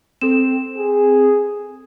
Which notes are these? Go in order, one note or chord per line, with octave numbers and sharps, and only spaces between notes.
C4 A4 E7
G#4